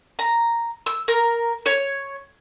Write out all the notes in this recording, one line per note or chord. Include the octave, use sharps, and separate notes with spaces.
A#5
E6
A#4
C#5